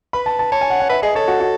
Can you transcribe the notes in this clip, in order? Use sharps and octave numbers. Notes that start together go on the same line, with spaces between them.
B4 B5
A5
A5
C#5 A5
G#5
F#5
F#5
B4 E5
G#4 D#5
A4 C#5
F#4
F#4